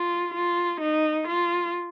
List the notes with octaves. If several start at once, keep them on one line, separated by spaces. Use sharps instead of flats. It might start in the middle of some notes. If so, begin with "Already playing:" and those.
Already playing: F4
F4
D#4
F4